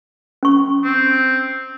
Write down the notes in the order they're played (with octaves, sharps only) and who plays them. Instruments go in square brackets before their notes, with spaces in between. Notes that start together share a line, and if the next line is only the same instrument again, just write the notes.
[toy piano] C#4 C#6
[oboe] C4